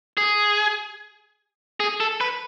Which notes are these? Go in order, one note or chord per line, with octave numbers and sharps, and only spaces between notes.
G#4
G#4
A4
B4